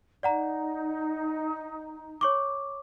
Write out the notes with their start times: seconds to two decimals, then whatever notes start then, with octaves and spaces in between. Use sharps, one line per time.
0.23 D#4 D5 F#5 A#5
2.21 C#5 C#6 D6